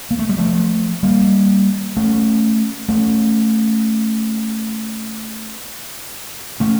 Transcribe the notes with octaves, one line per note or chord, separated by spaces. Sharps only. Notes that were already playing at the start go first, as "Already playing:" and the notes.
A#3
A3
G3
F3 A3
G3 A#3
A3 C#4
A3 C#4
A3 C#4